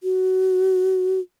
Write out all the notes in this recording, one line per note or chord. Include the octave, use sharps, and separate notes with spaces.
F#4